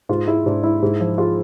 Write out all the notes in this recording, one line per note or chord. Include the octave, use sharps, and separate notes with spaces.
G#2 F4
G#3 E4
G#2 D4
G#3 E4
G#2
F3
G#3 F4